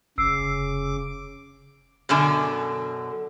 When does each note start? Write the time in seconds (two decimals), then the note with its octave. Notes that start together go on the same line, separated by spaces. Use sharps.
0.18 F1 C#3 D6 E6 C7
2.09 F#2 B2 D3 G#5